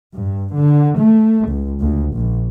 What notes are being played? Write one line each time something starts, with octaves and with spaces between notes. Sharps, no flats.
G2
D3
A3
C#2
D2
A#1